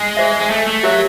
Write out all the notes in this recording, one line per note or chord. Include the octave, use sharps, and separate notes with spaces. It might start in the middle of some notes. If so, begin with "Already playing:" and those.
Already playing: G#3
G#4 C5 E5
G#3
A3
A3
F#3 G4 A#4 C#5 E5